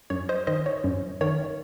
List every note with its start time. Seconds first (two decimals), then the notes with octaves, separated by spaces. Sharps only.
0.10 F#2 C#5
0.29 C5 D#5
0.47 D#3 C5 D#5
0.66 C#5
0.84 F#2
1.21 D#3 C#5